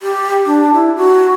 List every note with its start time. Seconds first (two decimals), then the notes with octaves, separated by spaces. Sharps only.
0.02 G4
0.46 D4
0.74 E4
0.96 F#4